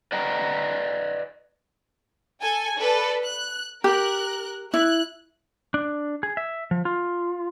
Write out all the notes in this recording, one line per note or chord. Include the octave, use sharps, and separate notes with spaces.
B4 D5 D#5 F#5 G5 A#5
A4 G#5
A4 B4 D5
F#6
G4 A#4 F#6
E4 F#6
D4
G#4
E5
F3
F4